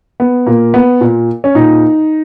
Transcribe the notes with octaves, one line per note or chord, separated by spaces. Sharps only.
B3
A#2 A#3
B3
A#2
C#4
A#2 D#4